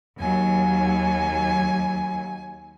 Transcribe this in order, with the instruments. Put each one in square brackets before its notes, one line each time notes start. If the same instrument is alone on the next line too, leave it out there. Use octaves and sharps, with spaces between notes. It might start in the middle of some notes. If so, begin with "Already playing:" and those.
[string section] D#2 F#3 [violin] G#5